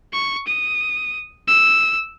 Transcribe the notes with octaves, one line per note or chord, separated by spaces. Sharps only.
C#6
D#6
E6